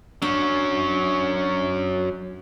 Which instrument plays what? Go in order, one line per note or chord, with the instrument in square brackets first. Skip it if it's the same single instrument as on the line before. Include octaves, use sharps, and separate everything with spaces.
[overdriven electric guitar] F#3 C#4 [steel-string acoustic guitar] D4